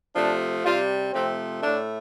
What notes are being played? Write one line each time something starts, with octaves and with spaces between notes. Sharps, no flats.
C3 F3 A3 D4
C3 G3 F4
C3 F3 A3 C4
A2 A3 D4